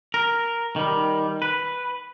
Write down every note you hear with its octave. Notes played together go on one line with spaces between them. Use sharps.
A#4
D#3 G3
B4